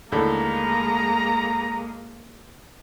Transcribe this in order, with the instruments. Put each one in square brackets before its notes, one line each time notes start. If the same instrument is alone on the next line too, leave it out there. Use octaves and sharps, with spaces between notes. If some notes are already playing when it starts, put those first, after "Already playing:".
[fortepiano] D#2 A2 D3 [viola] G#3 A#3 [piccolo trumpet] A#5